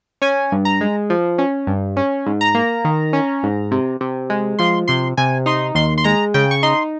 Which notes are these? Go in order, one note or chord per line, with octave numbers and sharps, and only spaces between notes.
C#4 G#5
G2
A#5
G#3
F3
C#4
G2
C#4
G#2
A#5
A#3
D#3
C#4
G#2
C3
C3
G#3
F3 C6
C3 C6
C3 G#5
D#4 C6
D#2 C6
C6
G#3 A#5
C#3 G5
C#6
D#4 C6